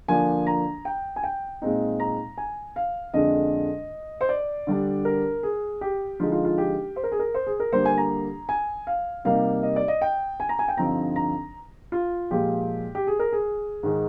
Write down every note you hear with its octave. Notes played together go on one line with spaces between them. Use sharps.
D3 F3 A#3 D4 G#5
A#5
G5
G#5
G5
A#2 G#3 C4 D#4
A#5
G#5
F5
F2 D3 G#3 D4 D#5
C5
D5
D3 G3 D4
A#4
G#4
G4
D3 F3 G#3 D#4 F4
F4
F4
G4
C5
A#4
G#4
A#4
C5
G#4
A#4
D3 G3 A#3 C5
G#5
A#5
G#5
F5
C3 G3 A#3 D#4 F5
D#5
D5
D#5
G5
G#5
A#5
G#5
G5
G2 D3 F3 C4 D#4 A#5
A#5
F4
A#2 F3 G#3 G4
G4
G#4
A#4
G#4
G#2 D#3 G#3